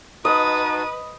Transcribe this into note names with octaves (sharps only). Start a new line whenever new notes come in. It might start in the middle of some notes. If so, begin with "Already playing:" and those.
D#4 F#4 B4 D#5 A5 D#6